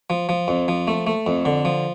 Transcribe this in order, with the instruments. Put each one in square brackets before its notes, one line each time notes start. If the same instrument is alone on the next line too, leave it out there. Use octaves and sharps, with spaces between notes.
[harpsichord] F3
F3
F2
F3
A3
A3
F2
D3
F3